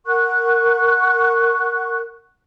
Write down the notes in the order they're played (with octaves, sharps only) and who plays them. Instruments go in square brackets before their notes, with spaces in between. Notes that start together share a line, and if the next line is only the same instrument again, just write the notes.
[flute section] A#4 F#5 C#6 F#6